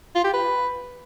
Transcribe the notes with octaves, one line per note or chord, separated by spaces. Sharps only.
F4
G4
B4